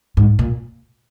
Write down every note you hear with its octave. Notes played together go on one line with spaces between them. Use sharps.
G#2
A#2